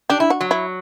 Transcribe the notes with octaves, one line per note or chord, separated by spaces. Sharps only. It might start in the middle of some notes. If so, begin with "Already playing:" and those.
D4 G4
E4
F#4
F#3
E4